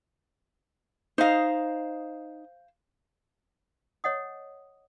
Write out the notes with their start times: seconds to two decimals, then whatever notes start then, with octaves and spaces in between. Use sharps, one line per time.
1.18 D#4 C5 D#5 F5
4.04 C#5 D#5 F#5 D#6